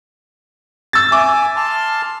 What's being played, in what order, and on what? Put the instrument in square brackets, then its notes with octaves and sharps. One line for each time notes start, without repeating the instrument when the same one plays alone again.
[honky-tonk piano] E6 A6
[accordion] E5 G#5 [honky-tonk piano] D6
[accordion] A5 C6 F6